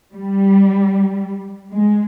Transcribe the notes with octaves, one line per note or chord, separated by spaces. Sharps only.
G3
G#3